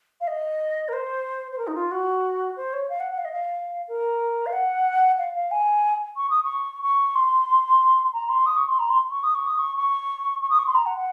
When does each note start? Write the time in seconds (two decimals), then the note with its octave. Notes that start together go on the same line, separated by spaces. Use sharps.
0.21 F5
0.27 D#5
0.88 A#4
0.93 C5
1.51 C5
1.58 A#4
1.67 D#4
1.75 F4
1.91 F#4
2.56 C5
2.73 C#5
2.89 F5
3.00 F#5
3.11 F#5
3.18 F5
3.25 D#5
3.32 F5
3.88 A#4
4.46 F5
4.53 F#5
5.18 F5
5.34 F5
5.51 G#5
6.17 C#6
6.30 D#6
6.43 C#6
6.82 C#6
7.15 C6
8.13 A#5
8.29 C6
8.46 D#6
8.57 C#6
8.68 C6
8.79 A#5
8.89 C6
9.11 C#6
9.23 D#6
9.35 C#6
9.47 D#6
9.58 C#6
9.77 C#6
10.42 C#6
10.50 D#6
10.59 C#6
10.67 C6
10.75 A#5
10.86 F#5
10.96 F#5